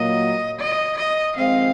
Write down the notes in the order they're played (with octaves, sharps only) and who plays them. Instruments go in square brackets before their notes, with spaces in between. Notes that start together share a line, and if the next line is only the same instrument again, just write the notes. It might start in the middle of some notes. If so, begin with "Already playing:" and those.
Already playing: [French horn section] A#2 F#3 A#3 [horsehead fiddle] D#5
[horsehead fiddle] D#5
D#5
[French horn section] F2 D#3 G#3 C4 [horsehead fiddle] F5